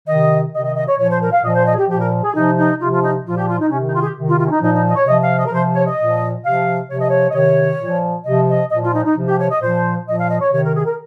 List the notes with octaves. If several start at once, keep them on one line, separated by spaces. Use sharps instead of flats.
C3 D#3 D#5
C3 D#3 D#5
D#5
D#5
C#5
A#2 F3 C#5
C5
A#4
F5
A#2 F3 D#5
C5
D#5
G#4
G4
A#2 F3 G4
A#4
G#4
C3 F3 D#4
D#4
C3 F3 F4
F4
D#4
A#2 F3 F4
G4
F4
D#4
C3 D#3 C#4
D#4
F4
G#4
G4
C3 D#3
F4
F4
C#4
D#4
A#2 F3 D#4
D#4
D#5
C#5
C3 F3 D#5
F5
D#5
A#4
C3 F3 C5
C#5
D#5
A#2 F3
C3 F3 F5
C3 F3 C#5
D#5
C#5
D#5
C3 D#3 C#5
A#2
F3
C3 F3 D#5
D#5
A#2 F3 D#5
F4
D#4
D#4
C3 F3
G4
C#5
D#5
A#2 F3 C5
A#2 F3 D#5
F5
D#5
C#5
C3 D#3 C#5
A#4
G#4
A#4